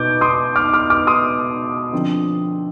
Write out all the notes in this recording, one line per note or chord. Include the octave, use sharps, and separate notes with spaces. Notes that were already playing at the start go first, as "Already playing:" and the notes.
Already playing: B2 D#4 D6 G6
C6 D#6
D6 F6
D6 F6
D6 F6
C6 D#6
D3 F3 C4